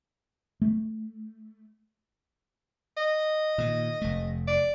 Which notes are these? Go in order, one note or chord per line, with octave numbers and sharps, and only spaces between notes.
A3
D#5
A#2 D#3
F1 A3
D5